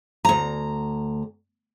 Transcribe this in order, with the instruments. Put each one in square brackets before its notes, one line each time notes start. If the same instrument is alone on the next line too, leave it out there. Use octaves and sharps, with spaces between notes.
[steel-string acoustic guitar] D2 A#5